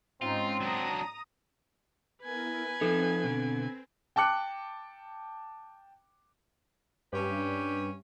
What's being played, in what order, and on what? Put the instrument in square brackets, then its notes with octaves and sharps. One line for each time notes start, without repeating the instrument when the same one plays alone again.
[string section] G#2 C#4 D#4 [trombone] C4 [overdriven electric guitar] F4
[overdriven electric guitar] F#3 D4 [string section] A#5 D#6
[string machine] B3 E4 A#4 [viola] B4 G#5
[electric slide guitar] F3 D#4 [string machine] C4 [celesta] A4
[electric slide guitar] B2 D3
[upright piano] G5 A5 D6 F#6 C#7
[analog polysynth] G2 [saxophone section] C#4 G4 B4